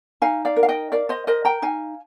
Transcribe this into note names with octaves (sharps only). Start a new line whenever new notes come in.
D#4 F5 G#5
D5 F5
A#4
F5
D#5 G5
A#4 D5 F5
C5 D#5
A#4 C5 D#5
G5 A#5
D#4 F5 G#5